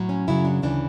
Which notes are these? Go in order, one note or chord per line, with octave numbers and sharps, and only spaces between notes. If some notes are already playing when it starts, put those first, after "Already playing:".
Already playing: A2 F#3
C#4
F#2 C#3 F#3 E4
D4
D2 C#3 E3 D4